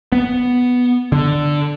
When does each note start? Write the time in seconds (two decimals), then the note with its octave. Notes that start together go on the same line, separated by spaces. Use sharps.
0.12 B3
1.12 D3